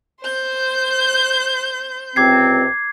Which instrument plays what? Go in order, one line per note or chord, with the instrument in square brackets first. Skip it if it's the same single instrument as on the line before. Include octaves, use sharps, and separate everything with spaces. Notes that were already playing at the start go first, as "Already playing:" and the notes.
[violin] C5 G6
[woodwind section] C#2 C3 C4 [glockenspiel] D6 G#6 C7